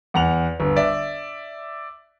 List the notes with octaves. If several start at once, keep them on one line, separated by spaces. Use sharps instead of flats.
E2 F#5 F7
G1
D5 E5